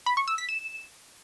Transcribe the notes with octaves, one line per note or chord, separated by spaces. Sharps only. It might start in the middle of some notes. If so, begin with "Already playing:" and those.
B5
C#6
E6
B6
E7